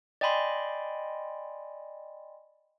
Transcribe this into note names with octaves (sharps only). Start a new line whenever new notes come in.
D5 D#5 G5 G#5 B5 C6